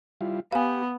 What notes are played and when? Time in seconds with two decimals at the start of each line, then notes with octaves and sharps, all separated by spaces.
0.21 G3 E4 F4
0.52 B3 G4 F5 G#5